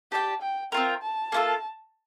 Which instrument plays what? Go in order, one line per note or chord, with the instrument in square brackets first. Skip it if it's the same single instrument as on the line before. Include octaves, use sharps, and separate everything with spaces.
[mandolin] G4 D5 G5 [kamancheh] A5
[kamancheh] G5
[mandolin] C4 F4 A#4 [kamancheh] G5
[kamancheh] A5
[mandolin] A#3 D4 F4 A4